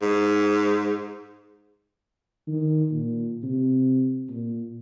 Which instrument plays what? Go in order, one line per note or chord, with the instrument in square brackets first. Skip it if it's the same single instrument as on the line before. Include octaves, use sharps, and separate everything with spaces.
[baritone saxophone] G#2
[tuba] D#3
A#2
C3
A#2